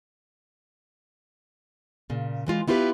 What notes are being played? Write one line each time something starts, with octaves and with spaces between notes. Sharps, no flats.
A#2 C#3
E3 G#3 F4
B3 E4 F4 G4 B4